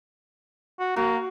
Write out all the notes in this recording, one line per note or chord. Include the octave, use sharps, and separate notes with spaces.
F#4
A#3 F#4